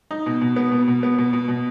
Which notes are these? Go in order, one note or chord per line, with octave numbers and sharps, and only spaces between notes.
D#4
B2
B2
B3
B2
B2
B3
B2
B2
B2